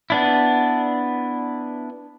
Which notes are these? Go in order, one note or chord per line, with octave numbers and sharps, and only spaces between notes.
B3 D4 E4